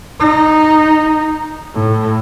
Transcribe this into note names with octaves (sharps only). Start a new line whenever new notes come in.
D#4
A2